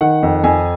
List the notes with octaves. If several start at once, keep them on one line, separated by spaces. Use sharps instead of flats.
D#3 F#5
F2
F2 G#5